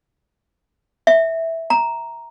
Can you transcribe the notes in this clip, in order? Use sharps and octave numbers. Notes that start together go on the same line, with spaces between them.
E5
A#5